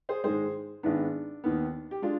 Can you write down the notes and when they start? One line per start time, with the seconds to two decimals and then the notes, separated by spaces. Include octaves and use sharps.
0.09 G#4 C5
0.24 G#2 D#3 G#3 G#4 C5
0.83 G#1 G#2 D#3 B3 D4
1.44 D#2 D#3 B3
1.91 G4
2.02 G#3 D4 F4